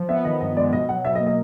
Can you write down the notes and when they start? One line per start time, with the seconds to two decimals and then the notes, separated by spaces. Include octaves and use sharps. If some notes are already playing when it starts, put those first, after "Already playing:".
Already playing: F3
0.09 B3 E5
0.25 D#3 D#5
0.41 G2 D#5
0.57 G#3 D5
0.72 B2 D#5
0.89 F#3 F#5
1.05 B2 E5
1.15 D#5
1.20 A#3
1.26 D#5